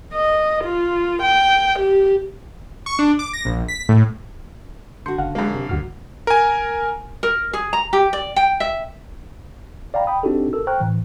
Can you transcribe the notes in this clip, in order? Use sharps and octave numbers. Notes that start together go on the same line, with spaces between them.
D#5
F4
G5
G4
C#6
D4
D6
A#6
A#1
B6
A2
D3 F#4 C6 G6 C#7
F#1 F5 F#5
F#2 G#3 A#3
C3
D2 G2 F#4 F6
A#4 G#5
A#4
G#4
A#5
G4
D5
G5
E5
D5 F5 G5 A#5 B5
G5 B5 D#6
C4 D4 D#4 F#4 G4 A4
A4 A#4 E6
C5 G5 A#5 C#6 F6 F#6
A2 E3